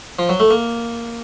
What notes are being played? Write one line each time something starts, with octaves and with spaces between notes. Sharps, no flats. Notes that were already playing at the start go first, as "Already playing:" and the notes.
F3
F#3
A3
A#3